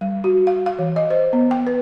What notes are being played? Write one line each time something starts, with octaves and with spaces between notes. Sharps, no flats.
G3
F#4
F5
F5
E3
D#5
C5
B3
G5
B4